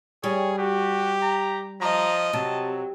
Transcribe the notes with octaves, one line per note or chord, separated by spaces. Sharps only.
G3 G#4 C#5
F#4 G4
A#5
F3 D#5 A#5
C3 F#3 A5